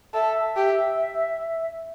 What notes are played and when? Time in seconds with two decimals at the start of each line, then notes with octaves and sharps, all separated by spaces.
0.14 A4 E5
0.56 G4